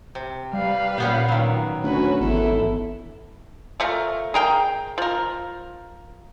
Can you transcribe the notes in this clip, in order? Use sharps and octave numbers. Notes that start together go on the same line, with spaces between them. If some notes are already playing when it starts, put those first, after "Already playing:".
C3
G3 B4 F5
A#2 G3 B3 C#4
D#3 F#3
D2 C#4 F#4 B4
G#1 E2 E4 A4
F3 A3 A#4
G#4 A#4 G5
F3 A#4